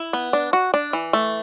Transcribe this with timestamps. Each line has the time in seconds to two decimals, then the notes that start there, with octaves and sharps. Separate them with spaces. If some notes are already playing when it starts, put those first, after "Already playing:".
Already playing: E4
0.13 B3
0.33 D4
0.53 F#4
0.74 D4
0.93 E3
1.13 A3